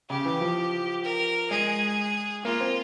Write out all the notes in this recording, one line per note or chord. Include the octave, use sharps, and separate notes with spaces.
C#3 G4
E3
F3
A#4
G#3 G#4
A#3 F4
C4